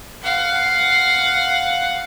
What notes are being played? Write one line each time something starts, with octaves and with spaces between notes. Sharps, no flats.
F5 F#5